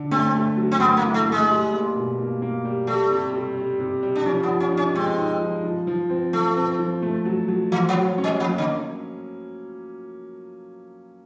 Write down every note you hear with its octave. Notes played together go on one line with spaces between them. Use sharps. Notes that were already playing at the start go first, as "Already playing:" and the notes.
Already playing: D3
A3 C4
A3
F#3
C4
A3 B3
A#3
E4
A3
A3
G#3
G3
A#3
B2
A#3
A#3
G3
G3 A3
C3
G3
G3
C3
G3
D4
F3 C#4
B3
F3
C#4
D#4
C#4
G#3 C4
D#4
F3
F3
F3
C4
F3 A3
C4
F3
A3
F#3
F#3
E3 F#3
F3
F#3
C#4
G3
F3 A#3
D3